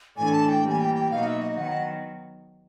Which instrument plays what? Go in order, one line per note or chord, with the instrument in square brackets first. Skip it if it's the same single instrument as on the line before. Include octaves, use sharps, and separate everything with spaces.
[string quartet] A2 E3 A3 D4 [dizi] G#5
[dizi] A5
G5
[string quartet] E3 G3 A#3 [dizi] G#5
[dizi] G5
G5
[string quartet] B2 F#3 A#3 D#4 F#4 [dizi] F5
[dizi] E5
D#5
[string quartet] D#3 F#3 B3 [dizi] F#5